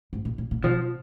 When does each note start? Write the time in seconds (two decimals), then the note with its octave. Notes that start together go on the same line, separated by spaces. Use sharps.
0.13 G#2
0.25 A#2
0.38 A#2
0.51 A#2
0.63 B2 F3